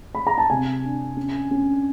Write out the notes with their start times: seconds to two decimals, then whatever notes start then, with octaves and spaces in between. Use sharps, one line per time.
0.15 B5
0.27 A#5
0.38 A5
0.50 C3 G#5
0.84 D4
1.17 C#4
1.51 C#4